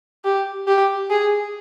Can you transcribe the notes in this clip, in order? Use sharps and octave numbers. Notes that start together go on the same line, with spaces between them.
G4
G4
G#4